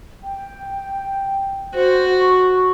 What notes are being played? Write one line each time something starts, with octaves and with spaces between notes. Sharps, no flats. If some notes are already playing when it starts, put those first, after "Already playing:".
G5
F#4 C5
C#6